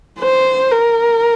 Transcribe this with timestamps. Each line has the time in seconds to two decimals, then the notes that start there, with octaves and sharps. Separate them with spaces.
0.20 C5
0.71 A#4